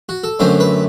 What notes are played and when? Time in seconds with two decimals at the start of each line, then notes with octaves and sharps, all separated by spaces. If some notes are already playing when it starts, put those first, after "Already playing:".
0.09 F#4
0.24 A4
0.39 F#2 D3 F#3 A3 C4 C5
0.60 B4